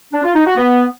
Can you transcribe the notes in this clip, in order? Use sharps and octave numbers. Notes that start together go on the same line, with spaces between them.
D4
F4
D#4
F#4
B3